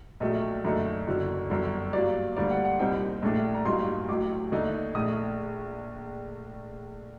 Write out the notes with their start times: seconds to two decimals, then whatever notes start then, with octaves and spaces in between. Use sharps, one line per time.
0.20 A#1 A#2 F#3 A3 D#5
0.64 F#2 D3 A3 D#4
1.07 F#1 F#2 D3 F#3
1.50 G1 F#2 D3
1.93 G2 F#3 A#3 D5
2.37 D2 D3 G3 A#3 D5
2.51 F#5
2.65 F#5
2.79 C2 A#2 G3 C4 D#4 G5
3.22 A#1 A2 A3 D4
3.55 A#5
3.65 A1 G2 F#3 A#3 D#4 C6
4.08 A1 A2 F#3 D6
4.52 D#2 D3 A3 D#4
4.94 A#1 A2 A3 D#6